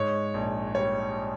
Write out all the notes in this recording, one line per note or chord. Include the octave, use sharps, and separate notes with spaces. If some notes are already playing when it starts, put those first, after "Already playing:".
Already playing: G#2 C#5
A#1
G3 C#5